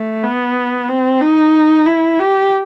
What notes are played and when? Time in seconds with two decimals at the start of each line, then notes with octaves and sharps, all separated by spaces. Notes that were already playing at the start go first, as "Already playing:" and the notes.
Already playing: A3
0.24 B3
0.89 C4
1.21 D#4
1.86 E4
2.19 G4